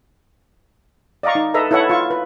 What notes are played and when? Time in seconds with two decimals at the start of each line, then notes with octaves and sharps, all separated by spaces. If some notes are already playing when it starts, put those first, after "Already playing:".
1.23 D5 D#5 F5 A#5 C#6
1.35 D#4
1.54 A4 B4 D#5 E5 A#5
1.71 E4 A4 B4 C#5 F#5 C#6
1.90 F4 C#6
2.11 B4